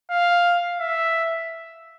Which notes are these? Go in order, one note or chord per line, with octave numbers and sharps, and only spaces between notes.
F5
E5